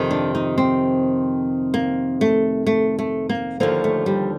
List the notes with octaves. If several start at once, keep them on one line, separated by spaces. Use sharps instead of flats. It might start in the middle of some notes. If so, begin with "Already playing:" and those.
Already playing: F2 C3 D#3
D4
D#4
C4
A#3
A3
A3
A3
A#3
D#2 D3 F3 A#3
A3
G3